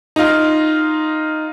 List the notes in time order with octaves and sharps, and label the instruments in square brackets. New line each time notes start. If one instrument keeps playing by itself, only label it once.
[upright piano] D#4 F4